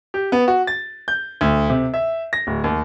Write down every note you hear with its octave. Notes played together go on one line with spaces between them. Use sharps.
G4
B3
F#4
A6
G6
D2
C3
E5
A#6
D1
D#2